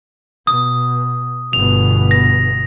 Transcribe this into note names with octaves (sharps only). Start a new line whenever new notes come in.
B2 D#6
G1 B2 F7
A#6